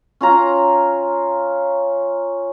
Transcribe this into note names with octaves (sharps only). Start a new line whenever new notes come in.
C#4 F4 A#5